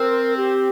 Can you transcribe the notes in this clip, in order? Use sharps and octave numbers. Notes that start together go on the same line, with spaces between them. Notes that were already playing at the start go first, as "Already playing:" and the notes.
Already playing: C4 A#4
G4